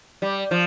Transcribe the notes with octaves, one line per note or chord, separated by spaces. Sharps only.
G3
F3